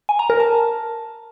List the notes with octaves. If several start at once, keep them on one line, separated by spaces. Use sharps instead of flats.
G#5
A#5
A#4
A5